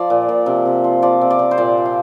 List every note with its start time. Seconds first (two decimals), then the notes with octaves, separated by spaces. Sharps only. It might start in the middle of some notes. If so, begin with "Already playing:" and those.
Already playing: F3 D5
0.10 A#2
0.29 A#2
0.46 C3
0.65 C3
0.84 F3
1.02 F3 D5
1.21 C3
1.31 D5
1.39 C3
1.51 C5
1.58 A#2 D5
1.77 A#2
1.85 F5